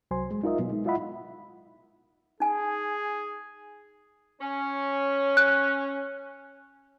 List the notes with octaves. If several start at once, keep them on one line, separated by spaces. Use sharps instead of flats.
C2 F#3 C5 G#5 C6
G#3
D#4 F4 A#4 D#5 E5
B2 F#3 B3
G#3 D#4
E4 F4 D#5 E5 F#5 B5
D#4 G#4 G#5
C#4
F#6